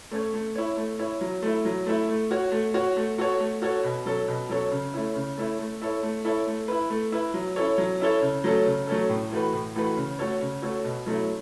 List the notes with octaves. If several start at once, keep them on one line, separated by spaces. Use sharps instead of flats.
A3 C#4 A4 C#5
A3
E4 C#5
A3
E4 C#5
F#3
A3 E4
F#3
A3 E4
A3
F#4 C#5
A3
F#4 C#5
A3
F#4 A4 C#5
A3
F#4 A4 C#5
B2
F#3 C#4 A4 C#5
B2
F#3 C#4 A4 C#5
C#3
A3 C#4 E4
C#3
A3 C#4 E4
A3
E4 A4 C#5
A3
E4 A4 C#5
A3
E4 B4
A3
E4 B4
F#3
C#4 E4 A4 C#5
F#3
C#4 E4 A4 C#5
C#3
F#3 A3 C#4 A4
C#3
F#3 A3 C#4 A4
A2
E3 A3 F#4 B4
A2
E3 A3 F#4 B4
C#3
A3 F#4 A4 C#5
C#3
A3 F#4 A4 C#5
B2
F#3 A3 C#4 E4